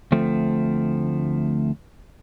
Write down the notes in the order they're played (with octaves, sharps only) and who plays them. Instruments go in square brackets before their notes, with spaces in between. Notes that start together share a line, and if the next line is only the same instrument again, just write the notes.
[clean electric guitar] D2 F3 A3 C4